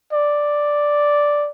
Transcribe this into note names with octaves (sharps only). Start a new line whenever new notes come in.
D5